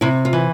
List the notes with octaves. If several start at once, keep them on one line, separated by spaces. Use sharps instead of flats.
C3 E4
F4
E3